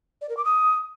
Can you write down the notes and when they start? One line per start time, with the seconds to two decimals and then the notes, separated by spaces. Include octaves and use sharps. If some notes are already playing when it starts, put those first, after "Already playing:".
0.21 D5
0.29 A#4
0.37 D6
0.45 D#6